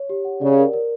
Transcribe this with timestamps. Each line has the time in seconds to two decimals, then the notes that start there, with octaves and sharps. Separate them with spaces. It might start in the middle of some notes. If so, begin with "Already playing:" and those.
Already playing: C#5
0.10 G4
0.25 F#5
0.41 C#3 D5
0.58 A#4
0.73 A#4